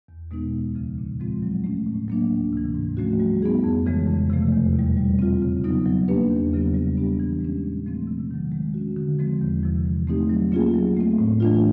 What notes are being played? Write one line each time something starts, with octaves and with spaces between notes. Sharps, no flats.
E2
B2 G#3 B3 D#4
D2
C#3 F3
A#2
F3 G#3 C4 F4
F#3
A3 C#4
A2
F#3 A#3 D4
D2
C3 E3
G#2
F3 A3 C#4 F#4
G3
B3 D#4 G#4
F2
C#3 E3 G#3
F2
C3 F3 A3
E2
B2 G3
G3
C4 F4
C#3
F#3 B3 D#4
F#3
A#3 D4 G4 B4
E2
C#3 F#3 B3
G3
B3 D4 G4
E3
G#3 C#4
A#2
F3 A3 C4
C3
D#3 F#3
G#3
C#4 F#4
D3
F3 G#3 C4
E2
C3 F3
E3
A3 C4 D#4 G4
F#3
A#3 C#4 F4 G#4
F#3
A3 C4
A2
E3 A3 D4 F4